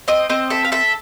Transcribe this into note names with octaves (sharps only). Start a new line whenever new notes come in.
C4 D#5
C4 D#5
A4 E5
F5
A4 E5